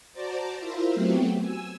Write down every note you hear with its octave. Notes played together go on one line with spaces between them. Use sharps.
F#4 C5 D5 A5 A#5 D6
E4 F4 A#4 C5 E5
F#3 A3 B3 C4 F#4 G4
G#5 E6